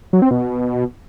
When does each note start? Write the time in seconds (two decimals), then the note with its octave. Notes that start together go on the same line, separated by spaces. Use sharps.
0.13 F#3
0.22 C4
0.31 B2